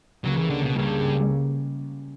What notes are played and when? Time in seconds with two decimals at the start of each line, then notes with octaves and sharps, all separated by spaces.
0.24 C#2 C#3 F#3 G3 A#3 C#4
0.37 E3
0.50 D3
0.62 B2
0.74 C#2 G2 C#3 G3 A#3 C#4